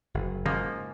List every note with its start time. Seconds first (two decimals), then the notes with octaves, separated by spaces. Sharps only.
0.14 F#1
0.46 G#2 C#3 F3 A#3